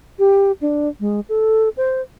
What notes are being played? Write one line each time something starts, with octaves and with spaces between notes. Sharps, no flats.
G4
D4
G#3
A4
C5